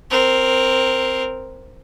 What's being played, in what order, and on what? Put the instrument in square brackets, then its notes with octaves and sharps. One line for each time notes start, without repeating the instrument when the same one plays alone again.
[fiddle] C4 A#4